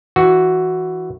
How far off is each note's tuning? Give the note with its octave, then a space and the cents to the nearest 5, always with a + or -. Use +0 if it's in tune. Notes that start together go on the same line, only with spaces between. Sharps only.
E3 +0 F#4 +0